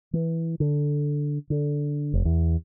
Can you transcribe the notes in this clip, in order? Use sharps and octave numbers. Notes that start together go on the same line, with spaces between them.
E3
D3
D3
F1
E2